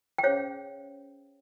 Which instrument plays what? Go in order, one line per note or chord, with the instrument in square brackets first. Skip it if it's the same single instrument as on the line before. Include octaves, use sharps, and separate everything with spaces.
[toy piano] G5
C#4 G#4 C5 C#5 F5